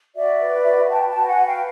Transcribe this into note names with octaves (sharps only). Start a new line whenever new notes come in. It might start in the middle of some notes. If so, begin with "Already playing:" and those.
F#4 D5 E5
B4
F#4
B4 G5 A5
G5 A5
F#4
F#5 G#5
B4
F5 G5